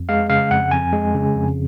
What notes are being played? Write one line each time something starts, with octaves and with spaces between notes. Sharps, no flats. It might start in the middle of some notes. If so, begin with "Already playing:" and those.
Already playing: F2
G#3 F5
C#3 F5
F2 F#5
F2 G#5
G#3
C#3
F2